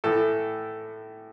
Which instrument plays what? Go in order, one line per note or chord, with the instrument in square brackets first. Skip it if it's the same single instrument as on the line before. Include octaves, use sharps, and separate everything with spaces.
[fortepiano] A2 E3 A4